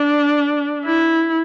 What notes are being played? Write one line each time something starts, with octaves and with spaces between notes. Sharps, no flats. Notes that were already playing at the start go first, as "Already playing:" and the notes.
Already playing: D4
E4